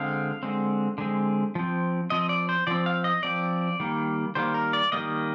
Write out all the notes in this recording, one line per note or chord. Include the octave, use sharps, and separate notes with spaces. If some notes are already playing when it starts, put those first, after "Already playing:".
Already playing: D3 G#3 C4 F5
D3 G#3 C4
D3 G#3 C4
F3 C4
F3 C4 D#5
D5
C5
F3 C4 D5
F5
D#5
F3 C4 D5
D#3 G3 A#3
D#3 G3 A#3 C5
A#4
D5
D#3 G3 A#3 D#5